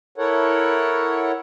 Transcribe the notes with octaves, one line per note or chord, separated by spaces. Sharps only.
E4 A4 A#4 C#5 F#5